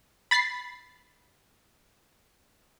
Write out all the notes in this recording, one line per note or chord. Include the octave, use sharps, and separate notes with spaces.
B5 A6 B6 C7